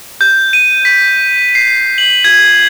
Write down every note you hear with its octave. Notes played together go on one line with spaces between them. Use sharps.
G6
D#7
B6
C7
F#7
G#6